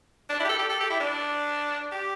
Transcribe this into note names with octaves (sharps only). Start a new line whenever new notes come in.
D4
E4
G4
A4
G4
A4
G4
E4
D4
G4